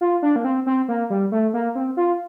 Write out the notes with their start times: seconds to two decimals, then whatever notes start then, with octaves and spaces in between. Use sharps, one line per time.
0.01 F4
0.22 D4
0.36 A#3
0.45 C4
0.66 C4
0.88 A#3
1.10 G3
1.32 A3
1.54 A#3
1.75 C4
1.97 F4